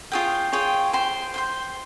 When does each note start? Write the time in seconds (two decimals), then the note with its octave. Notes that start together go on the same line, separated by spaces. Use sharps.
0.12 F4 G#4 C#5 G5
0.52 F4 G#4 C#5 G5
0.93 C5 G5 C6
1.34 C5 G5 C6